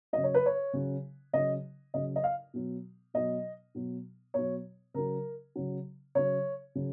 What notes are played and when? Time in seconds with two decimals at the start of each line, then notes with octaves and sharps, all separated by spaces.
0.13 C#3 F#3 D#5
0.24 C#5
0.34 B4
0.46 C#5
0.73 C#3 F#3
1.33 C#3 F#3 D#5
1.94 C#3 F#3 D#5
2.16 D#5
2.24 F5
2.54 B2 F#3
3.14 B2 F#3 D#5
3.75 B2 F#3
4.34 B2 F#3 C#5
4.94 C#3 F#3 A#4
5.56 C#3 F#3
6.15 C#3 F#3 C#5
6.75 C#3 F#3